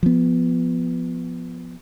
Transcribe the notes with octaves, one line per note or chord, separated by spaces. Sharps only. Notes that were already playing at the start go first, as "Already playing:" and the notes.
F3 B3